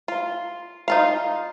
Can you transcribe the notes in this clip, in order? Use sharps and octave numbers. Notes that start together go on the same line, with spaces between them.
F4
D#4 F4 F5